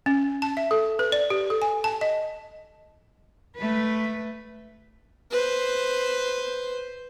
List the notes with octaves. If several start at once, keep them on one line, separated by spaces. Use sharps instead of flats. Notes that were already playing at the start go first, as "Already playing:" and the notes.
C#4
A5
E5
A4
B4
D5
G4
A4
G#5
A5
D#5
A3 B4
B4 C5